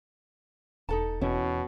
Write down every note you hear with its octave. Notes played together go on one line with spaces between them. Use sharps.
E1 D#4 A4 A5
E2 B2 C#4 E4